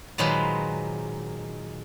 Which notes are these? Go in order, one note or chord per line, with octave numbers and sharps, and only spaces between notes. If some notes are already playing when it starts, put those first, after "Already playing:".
A#2 D#3 F#3 G#3 B4 C5